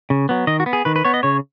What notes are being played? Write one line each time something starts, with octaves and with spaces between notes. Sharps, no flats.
C#3
F#3 B3
D#3 D#5
F#4
B3
G#4
D#3 B4
B4
B3 C#5
D#5
C#3 C#5